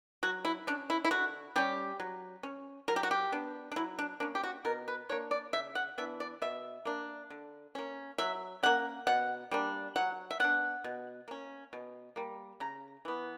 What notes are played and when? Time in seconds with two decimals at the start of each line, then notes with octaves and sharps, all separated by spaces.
0.23 F#3 F#4
0.45 E4
0.67 C#4 D4
0.90 E4
1.05 E4
1.11 D3 F#4
1.56 G3 C#4 G4
2.00 F#3
2.43 C#4
2.88 F#3 A#4
2.96 G4
3.03 F#4
3.11 G4
3.32 B3 D4
3.72 D4
3.76 F#3 E4
3.99 D4
4.20 A#3 C#4 D4
4.35 G4
4.43 F#4
4.65 B2 A#4
4.88 B4
5.09 A#3 D4 C#5
5.31 D5
5.53 C#3 E5
5.75 F#5
5.98 E3 B3 D4 E5
6.20 D5
6.42 B2 E5
6.85 A#3 D4
7.30 D3
7.75 A#3 C#4
8.18 F#3 E5
8.63 A#3 C#4 F#5
9.07 B2 F#5
9.51 G3 A#3 D4
9.96 F#3 F#5
10.31 E5
10.40 B3 D4 F#5
10.84 B2
11.28 A#3 C#4
11.73 B2
12.16 G3 A#3
12.60 C#3 A#5
13.05 E3 B3